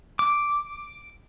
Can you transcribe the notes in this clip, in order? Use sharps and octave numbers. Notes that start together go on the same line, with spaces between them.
D6